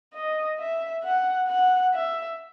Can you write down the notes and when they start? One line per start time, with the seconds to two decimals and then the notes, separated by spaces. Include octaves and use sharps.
0.14 D#5
0.59 E5
1.04 F#5
1.48 F#5
1.94 E5